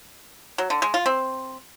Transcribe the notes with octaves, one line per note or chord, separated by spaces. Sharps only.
F#3
D3
G#3
F4
C4